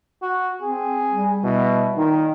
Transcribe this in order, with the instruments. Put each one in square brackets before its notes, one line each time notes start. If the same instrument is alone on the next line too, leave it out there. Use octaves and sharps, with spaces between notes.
[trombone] F#4
[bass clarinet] C4 [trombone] G#4
[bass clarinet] G3
[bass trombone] B2 [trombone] E4
[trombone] A#2 [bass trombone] D#3 [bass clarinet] D#4